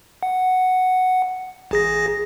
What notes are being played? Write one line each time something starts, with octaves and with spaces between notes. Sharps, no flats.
F#5
A1 G#4 A#6